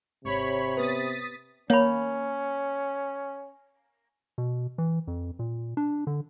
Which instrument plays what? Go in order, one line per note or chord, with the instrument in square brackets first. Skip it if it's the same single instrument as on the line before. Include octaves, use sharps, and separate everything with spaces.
[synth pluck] G#1 G#2 [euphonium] C3 [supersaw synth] C#5 B5
[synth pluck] B3 B4 [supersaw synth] D#6 A6 B6
[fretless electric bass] A#3 [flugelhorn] C#4 [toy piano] C#5 B5
[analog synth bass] B2
E3
F2
A#2
D4
D3